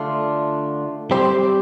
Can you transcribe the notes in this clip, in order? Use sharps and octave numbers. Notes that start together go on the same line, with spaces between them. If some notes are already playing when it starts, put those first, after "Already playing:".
Already playing: D3 A3 D4 F4
G3 C4 G4 C5